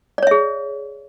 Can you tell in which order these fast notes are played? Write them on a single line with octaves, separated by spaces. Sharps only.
D5 C#5 E5 G#4